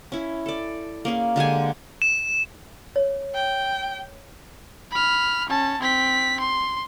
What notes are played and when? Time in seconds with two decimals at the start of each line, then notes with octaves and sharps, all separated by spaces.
0.12 C#4 E4
0.46 A4 D5
1.05 A#3 C#4 G#4
1.36 D3 G#3 G4 G#5
2.02 E7
2.96 C#5
3.34 G5
4.91 B5 F6
5.49 C#4 A5
5.81 C4 B6
6.40 C6